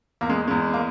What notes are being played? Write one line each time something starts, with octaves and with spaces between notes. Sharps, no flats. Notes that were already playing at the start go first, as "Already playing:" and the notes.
E2 A#3
G#3
E2 G#3
A#3